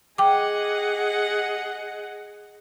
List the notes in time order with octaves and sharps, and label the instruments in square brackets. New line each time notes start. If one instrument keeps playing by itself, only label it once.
[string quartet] G#4 D#5 F#5 [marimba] G5 D6